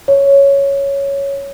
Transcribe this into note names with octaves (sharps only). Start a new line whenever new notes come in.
C#5